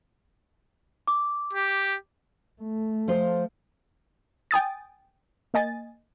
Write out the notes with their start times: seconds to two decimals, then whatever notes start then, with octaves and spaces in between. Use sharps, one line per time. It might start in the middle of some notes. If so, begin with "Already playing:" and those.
1.07 D6
1.53 G4
2.62 A3
3.08 F3 F4 C5
4.51 G5 G#5 D#6 A6
5.54 A#3 D#5 G#5 A6